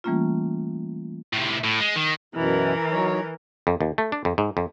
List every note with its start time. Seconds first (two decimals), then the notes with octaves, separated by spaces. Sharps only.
0.04 E3 G3 A3 A#3 C#4 F4
1.33 A2 C3
1.64 A2
1.80 G#3
1.96 D#3
2.35 F#2 B2 E3 E4 A#4
2.91 F#3 D#4 C#5
3.67 F2
3.81 D#2
3.98 A3
4.12 D4
4.25 F2
4.38 G#2
4.57 F2